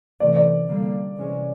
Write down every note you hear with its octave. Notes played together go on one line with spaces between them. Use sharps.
C3 E3 A3 D5
D5
D3 G3 A#3
C3 E3 G#3 C#4